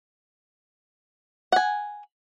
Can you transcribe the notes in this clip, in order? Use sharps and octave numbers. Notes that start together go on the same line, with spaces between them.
F#5 G#5